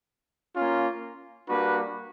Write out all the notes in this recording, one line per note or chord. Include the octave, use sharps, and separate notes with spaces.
A#3 C#4 F4
G3 A#3 D4 F#4 B4